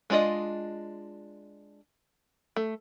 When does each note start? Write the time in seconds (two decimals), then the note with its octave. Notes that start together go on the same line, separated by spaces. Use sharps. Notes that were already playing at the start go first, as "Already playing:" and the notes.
0.10 G#3 D4 F4 D5 D#5
2.56 A3